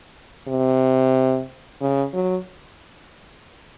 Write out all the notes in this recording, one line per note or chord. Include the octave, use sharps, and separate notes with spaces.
C3
C#3
F#3